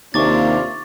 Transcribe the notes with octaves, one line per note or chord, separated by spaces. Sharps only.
D#2 C3 A#3 D4 F4 C#6 D6 A6